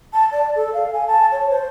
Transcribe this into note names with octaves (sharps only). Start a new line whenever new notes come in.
A5
D5
A4
F5
G#5
A5
C#5
C5